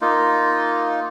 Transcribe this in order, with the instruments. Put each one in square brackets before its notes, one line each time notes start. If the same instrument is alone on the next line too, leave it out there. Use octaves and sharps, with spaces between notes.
[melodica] A#3 D#4 F4